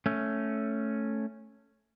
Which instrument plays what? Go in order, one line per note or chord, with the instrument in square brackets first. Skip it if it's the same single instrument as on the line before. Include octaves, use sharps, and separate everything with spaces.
[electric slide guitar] A3 C#4